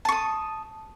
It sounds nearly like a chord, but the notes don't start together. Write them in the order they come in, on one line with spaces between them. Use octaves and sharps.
A5 C#6 D#6